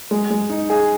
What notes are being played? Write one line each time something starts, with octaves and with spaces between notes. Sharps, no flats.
G#3
G#3
D#4
G#4